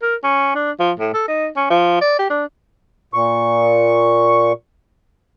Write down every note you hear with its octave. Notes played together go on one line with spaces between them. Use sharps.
A#4
C#4
D4
F3
A2
A4
D#4
C#4
F3
D5
G4
D4
A#2 C#6